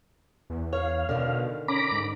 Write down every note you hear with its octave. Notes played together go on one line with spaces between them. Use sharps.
E2
C#5 F5
B2 D3 D#3
C#4 A#5 B5 D6
G#2